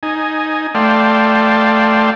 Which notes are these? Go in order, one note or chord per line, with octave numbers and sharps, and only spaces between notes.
D#4 G#5
A3 D5 F5 G5 A5 C6